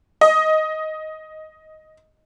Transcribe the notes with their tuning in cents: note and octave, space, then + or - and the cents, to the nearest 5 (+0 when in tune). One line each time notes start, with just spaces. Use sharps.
D#5 +5